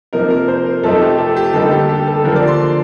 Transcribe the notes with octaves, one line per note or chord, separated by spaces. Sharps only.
C3 F3 A#3 D#4 A#4
A#4
C5
A#4
C3 F3 A3 C4 D#4 A4
G4
A4
G4
D3 G3 A#3 D#4 A4
G4
G4
A4
D3 F3 A#3 A#4
D5
C6